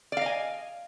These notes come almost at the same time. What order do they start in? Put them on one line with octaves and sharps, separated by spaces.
D5 F5 D#5 G#5